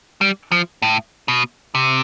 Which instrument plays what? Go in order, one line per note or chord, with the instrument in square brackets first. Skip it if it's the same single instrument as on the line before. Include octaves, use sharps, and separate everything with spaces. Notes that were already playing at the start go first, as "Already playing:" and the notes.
[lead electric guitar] G3
F3
A2
B2
C3